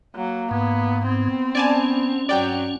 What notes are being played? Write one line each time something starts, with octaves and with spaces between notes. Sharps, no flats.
F#3 A#3
G#2 B3
B3 C4
B3 C#4 D5 G#5 A5
G2 F#3 D5 G5